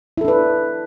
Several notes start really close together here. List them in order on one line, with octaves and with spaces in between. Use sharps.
E4 A4 D4 B4